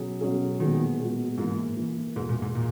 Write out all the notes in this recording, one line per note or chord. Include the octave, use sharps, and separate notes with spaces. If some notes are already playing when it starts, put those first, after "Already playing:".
Already playing: B2 F#3 C#4 G#4
B2 F#3 C#4 G#4
A#2 D#3 G#3 B3 F#4
A#2 G#3 B3 F#4
G#2 E3 A#3 E4
E3 A#3 E4
E2 G#2 B2 G#3
A#2
G#2
A#2